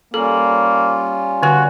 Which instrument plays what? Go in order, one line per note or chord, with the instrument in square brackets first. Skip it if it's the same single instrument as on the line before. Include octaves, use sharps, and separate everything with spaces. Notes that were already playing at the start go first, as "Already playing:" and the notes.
[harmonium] G3 C#4 F4 [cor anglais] A#3 [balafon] A4
[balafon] D3 G#5 [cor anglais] F#4